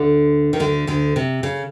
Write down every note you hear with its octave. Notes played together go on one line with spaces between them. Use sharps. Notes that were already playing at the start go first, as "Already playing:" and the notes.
Already playing: D2 D3
D#3
D2 D3
D2 D3
C3
C#3